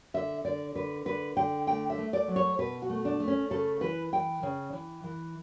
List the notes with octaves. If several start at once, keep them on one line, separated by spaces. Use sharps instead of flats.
D3 E5
D3 D5
D3 B4
D3 B4
D3 G5
A3 G5
E5
A3
D5
F#3
C#5
B2 B4
F#4
A3
D4
A3
C#4
C#3 A4
E3 B4
E3 G5
C#3
E3
E3